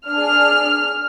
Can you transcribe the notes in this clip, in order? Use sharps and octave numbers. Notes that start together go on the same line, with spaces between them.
D4 G#4 F6